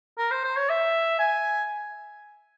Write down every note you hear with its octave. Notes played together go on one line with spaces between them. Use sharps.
A#4
C5
C5
C#5
E5
G#5